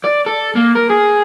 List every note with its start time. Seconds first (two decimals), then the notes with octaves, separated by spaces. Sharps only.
0.05 D5
0.27 A4
0.55 A#3
0.75 A#4
0.90 G#4